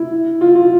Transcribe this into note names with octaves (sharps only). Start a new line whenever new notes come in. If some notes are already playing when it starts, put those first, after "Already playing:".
Already playing: E4
F4
F4